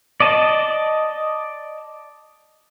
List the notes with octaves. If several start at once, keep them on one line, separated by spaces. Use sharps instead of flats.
D5 D#5 A5